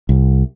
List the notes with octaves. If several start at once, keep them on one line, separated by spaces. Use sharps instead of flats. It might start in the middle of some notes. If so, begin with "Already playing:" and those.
C2